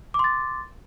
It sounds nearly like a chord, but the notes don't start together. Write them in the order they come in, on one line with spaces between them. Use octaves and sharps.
D6 C6 A6